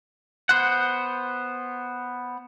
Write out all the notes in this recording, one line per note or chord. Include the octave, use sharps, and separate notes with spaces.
B3 C5 F#5